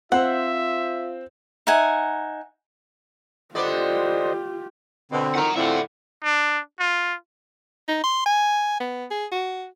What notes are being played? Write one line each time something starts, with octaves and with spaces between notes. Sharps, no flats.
C4 F4 C5 E5 F#5
D#4 E5 F#5 G#5
D3 B3 F4 G4 C5 D5 D#5
B2 D3 C4
F2 A2 D#3 F#5 A#5
A2 D3 C4 E4 F4 F#5
D4
F4
D#4
C6
G#5
B3
G#4
F#4